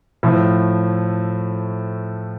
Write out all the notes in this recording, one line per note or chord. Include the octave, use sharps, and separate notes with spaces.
A2 F3 A3